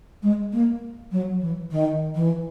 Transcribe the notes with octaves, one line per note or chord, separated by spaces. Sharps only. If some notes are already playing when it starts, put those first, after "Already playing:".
G#3
A#3
F#3
E3
D#3
E3